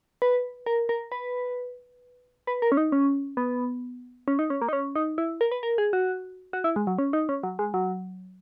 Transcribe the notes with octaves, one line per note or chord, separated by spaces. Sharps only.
B4
A#4
A#4
B4
B4
A#4
C#4
D#4
C#4
B3
C#4
D#4
C#4
A#3
D#4
C#4
D#4
E4
A#4
B4
A#4
G#4
F#4
F#4
E4
G#3
F#3
C#4
D#4
C#4
F#3
G#3
F#3